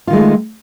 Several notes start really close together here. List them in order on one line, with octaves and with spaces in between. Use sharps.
F4 D#3 G#3 A3